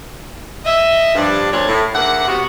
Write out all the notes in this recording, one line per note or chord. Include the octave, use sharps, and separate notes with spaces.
D#5 E5
G2 F3 D4
D2 A#2 F3 C4 D4 C#5
A2
D2 G#2 A#3 E5 F#5
C3 B3 F#4